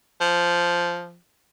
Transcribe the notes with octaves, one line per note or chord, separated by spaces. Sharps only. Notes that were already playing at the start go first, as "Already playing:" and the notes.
F3